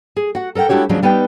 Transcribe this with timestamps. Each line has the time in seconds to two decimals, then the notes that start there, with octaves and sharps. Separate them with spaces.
0.17 G#4
0.35 F#4 F#5
0.55 A4 A#4 D5 F#5 G5
0.69 G#3 D4 E4 F#4 G4 C#5
0.89 D#2 C#3 F3 F#3 G#3 D4
1.02 G3 B3 D#4 B4 G5